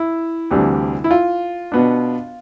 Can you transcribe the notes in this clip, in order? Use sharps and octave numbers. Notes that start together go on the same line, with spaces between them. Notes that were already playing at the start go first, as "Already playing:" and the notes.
Already playing: E4
D2 C3 E3 G3 D4
E4
F4
B2 B3 D4